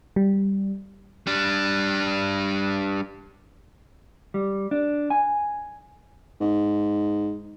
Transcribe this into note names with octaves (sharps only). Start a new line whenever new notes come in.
G3
G3 D4
G3
D4
G#5
G#2